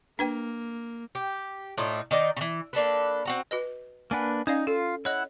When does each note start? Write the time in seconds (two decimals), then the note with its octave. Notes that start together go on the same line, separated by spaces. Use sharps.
0.19 A#3 D4 B4 G5
1.15 G4
1.78 A2 D4 D#4 F4
2.11 D#3 D#4 D5
2.37 C#3 E3
2.73 A#3 D4 A4 B4
3.25 C4 F#4 A#5
3.51 F#4 B4 D#5
4.11 A#3 D4 B4 F#5 G#5
4.47 C#4 D#4 D5 F5
4.67 F4 A4
5.05 E4 C#5 D#5 F#5